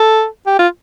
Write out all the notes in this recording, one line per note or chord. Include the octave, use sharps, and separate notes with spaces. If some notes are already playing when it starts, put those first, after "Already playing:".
Already playing: A4
G4
F4